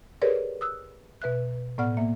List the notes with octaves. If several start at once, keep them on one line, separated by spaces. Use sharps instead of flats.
G4 G#4 A#4 B4 C#5 D5
D#6 E6 F#6
B2 B4 E5 F#6
A2 B3 D5 F#5 F6
A#3 E5